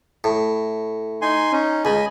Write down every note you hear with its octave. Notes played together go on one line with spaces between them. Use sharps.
A2
D#4 G#5 C6
C#4 D#4
C#2 D#5 G#5 B5